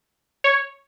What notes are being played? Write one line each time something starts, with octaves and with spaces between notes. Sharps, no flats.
C#5